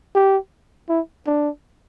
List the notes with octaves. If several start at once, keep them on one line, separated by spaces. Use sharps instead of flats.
G4
E4
D4